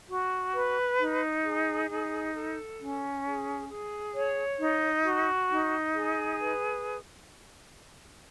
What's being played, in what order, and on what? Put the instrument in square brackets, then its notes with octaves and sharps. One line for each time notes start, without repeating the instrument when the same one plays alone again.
[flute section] F#4
B4
D#4
G#4
D#4
A4
C#4
G#4
G#4
C#5
D#4
F#4
D#4
G#4
B4